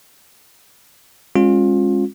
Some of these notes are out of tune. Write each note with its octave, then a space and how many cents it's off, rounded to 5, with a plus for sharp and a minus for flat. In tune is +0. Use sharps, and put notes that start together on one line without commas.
G#3 -20 C#4 -30 F4 +25